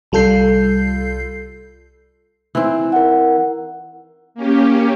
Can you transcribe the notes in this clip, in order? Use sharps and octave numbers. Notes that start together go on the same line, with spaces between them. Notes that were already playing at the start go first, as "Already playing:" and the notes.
C2 G3 F4 A4 G6 C7
E3 C4 D#4
A#4 F#5
A#3 C#4 G4